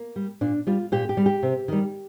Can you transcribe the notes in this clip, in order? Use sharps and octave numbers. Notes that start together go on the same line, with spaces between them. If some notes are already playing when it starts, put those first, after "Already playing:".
Already playing: A#3
G3
A#2 D4
G3 F4
A#2 G4
G4
G3
G4
C3
D#3 G3